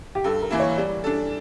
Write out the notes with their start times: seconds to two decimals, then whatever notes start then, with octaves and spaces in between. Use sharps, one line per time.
0.15 G4
0.24 G2 A4
0.42 A#4
0.51 E3 A#3 E4
0.60 C#5
0.77 G3 D5
1.04 D4 A4